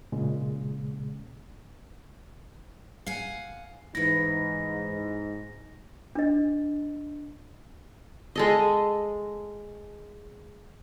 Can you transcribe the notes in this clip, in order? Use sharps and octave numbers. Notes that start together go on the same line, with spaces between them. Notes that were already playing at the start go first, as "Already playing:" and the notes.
A#2 C#3 G#3
F5 F#5 G#5
G#2 E3 D#4 E4 A#6
D4 D#5
G#3 A4 D#5